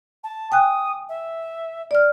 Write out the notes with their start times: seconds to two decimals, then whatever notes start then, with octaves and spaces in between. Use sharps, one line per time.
0.23 A5
0.52 G5 G#5 D#6 F#6
1.09 E5
1.91 D5 F6